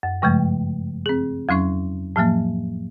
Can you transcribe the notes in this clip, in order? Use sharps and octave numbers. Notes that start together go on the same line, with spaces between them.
F#2
G2 C#3 F3 G#3 A3
C4 G#4
F2 F#3 C#4 C#6
A2 F3 F#3 A#3